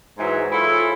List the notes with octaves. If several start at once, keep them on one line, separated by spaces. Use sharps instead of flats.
G#2 E3 F#3
E4 F4 G#4 A4 C#5 E5